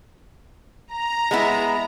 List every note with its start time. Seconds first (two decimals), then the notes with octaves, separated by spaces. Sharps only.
0.90 A#5
1.31 G#3 B3 E4